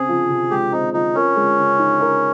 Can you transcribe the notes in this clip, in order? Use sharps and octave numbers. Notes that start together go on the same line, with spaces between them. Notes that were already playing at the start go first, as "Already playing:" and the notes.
Already playing: C#3 C4 G#4
F3
C3
G#3 G4
C4 D#4
F3 D#4
C#4 A#4
G#3
C#3
D#4
A#4